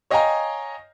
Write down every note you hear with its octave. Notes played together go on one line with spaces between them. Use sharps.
C#5 D#5 F5 G5 G#5 A#5